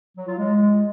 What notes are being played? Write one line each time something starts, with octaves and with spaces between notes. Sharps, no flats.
F#3
F4
G#3